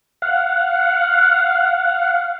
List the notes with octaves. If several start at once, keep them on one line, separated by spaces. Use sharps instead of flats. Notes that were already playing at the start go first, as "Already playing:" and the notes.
F5 F#5